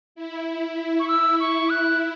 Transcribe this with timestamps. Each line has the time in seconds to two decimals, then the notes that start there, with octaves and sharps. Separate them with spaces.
0.15 E4
1.00 C#6
1.08 E6
1.40 C#6
1.70 F#6